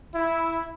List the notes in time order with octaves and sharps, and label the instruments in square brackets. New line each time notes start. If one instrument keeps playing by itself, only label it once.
[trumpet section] E4